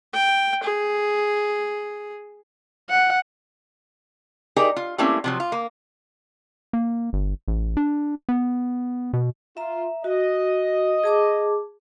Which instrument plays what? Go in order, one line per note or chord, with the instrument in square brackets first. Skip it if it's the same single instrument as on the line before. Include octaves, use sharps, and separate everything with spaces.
[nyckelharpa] G5
G#4
[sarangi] F#5
[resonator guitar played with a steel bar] D#4 G4 G#4 A#4 D5
F4
G3 A3 A#3 C4 C#4 E4
C3 F3 F#3
F4
A#3
[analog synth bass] A#3
G1
A1
D4
B3
B2
[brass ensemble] F4 [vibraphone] E5 A#5
[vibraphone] F#4 [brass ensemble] D#5
[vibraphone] G#4 A5 D6